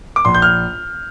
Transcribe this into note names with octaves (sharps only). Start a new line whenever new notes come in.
D6
A#1 C6
G6
F6